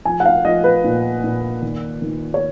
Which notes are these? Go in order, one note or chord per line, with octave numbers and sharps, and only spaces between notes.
F3 G#5
F#5
F5
F3 D#5
B4
A#2
A#2
D#3
D#3
C#5